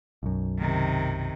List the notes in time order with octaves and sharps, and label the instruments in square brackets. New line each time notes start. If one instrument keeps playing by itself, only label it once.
[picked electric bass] B1 F#2
[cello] C3 D#3